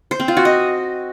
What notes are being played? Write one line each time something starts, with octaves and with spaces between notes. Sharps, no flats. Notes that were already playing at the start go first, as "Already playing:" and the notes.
C5
C4
F4
F#4
D#5